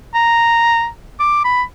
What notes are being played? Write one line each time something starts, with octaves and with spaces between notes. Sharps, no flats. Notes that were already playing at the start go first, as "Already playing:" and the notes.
A#5
D6
B5